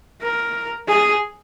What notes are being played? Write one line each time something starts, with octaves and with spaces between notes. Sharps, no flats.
A#4
G#4